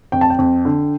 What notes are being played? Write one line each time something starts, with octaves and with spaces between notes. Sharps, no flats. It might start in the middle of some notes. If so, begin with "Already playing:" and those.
F2 G5
A5
G5
F2
D3